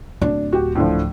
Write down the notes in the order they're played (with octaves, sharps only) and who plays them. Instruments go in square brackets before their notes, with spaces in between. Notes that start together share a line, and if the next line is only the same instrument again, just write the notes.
[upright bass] D1 [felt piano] D4
[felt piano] F#4 G4
A2 D3 F3